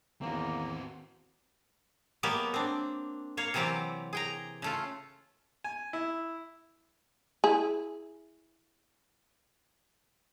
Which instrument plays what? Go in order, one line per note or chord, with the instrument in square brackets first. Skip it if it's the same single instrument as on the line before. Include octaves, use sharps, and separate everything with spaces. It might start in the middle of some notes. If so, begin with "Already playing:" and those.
[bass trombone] E2 [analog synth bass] D#3 [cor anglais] A#3 [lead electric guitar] C4 F#4
[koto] F#3 G#3 A#3 B3 G4
C4 D4
A#3 C#5 F5
C3 E3 F#3 C4 G4 D5
G#4 G5 A#5
C#3 A3 F4
[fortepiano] G#5
E4
[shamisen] E4 G#4